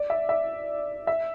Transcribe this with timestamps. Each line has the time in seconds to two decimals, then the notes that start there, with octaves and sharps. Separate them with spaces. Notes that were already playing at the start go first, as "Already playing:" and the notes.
Already playing: D5
0.10 E5
0.29 E5
1.07 E5